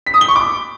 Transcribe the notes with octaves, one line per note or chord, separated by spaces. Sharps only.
B6
D#6
G7
C#6
D6